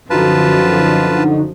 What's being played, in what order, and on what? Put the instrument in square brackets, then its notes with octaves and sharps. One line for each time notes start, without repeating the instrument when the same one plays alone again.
[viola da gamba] F#2 F3 [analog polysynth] D3 D#4 F#4 [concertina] F4 B4 A5